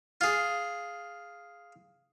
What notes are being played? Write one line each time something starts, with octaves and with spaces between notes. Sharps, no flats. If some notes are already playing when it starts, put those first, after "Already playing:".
F4 G#4